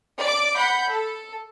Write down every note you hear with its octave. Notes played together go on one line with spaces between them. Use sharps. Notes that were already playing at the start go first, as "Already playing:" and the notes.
D5 D6
F#5 B5 G6
A4